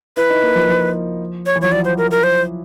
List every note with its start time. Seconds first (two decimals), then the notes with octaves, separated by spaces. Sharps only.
0.17 E4 B4
0.30 D#4
0.43 A#3
0.55 F3
0.69 F3
1.46 C#5
1.56 E3
1.61 F3 C#5
1.72 F#3 D5
1.85 C5
1.98 A#4
2.11 A#4
2.23 C5